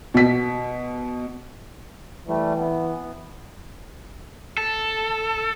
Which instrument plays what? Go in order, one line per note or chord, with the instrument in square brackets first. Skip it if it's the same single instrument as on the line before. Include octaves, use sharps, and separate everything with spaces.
[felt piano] B2 B6
[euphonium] E3 [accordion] G3 A3
[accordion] B3
[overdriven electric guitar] A4